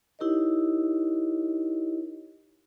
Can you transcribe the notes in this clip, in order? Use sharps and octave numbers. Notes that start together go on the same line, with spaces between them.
D#4 E4 G4 A#4 C#5 D#5